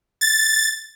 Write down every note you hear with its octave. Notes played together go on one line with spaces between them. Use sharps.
A6